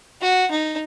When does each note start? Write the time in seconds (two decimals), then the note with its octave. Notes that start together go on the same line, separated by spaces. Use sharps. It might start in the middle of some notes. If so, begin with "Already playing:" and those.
0.21 F#4
0.51 D#4